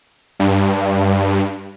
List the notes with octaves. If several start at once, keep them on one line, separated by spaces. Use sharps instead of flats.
G2